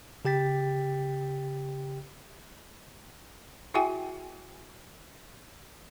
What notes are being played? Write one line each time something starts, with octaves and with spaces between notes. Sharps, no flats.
C#3 G4 G5 A6 B6
E4 F#4 G#4 E5 G5 G#5